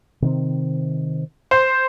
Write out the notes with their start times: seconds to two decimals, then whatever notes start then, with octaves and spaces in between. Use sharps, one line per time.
0.22 C3 D#3 C4
1.51 C5